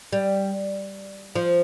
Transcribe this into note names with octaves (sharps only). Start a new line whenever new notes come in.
G3
F3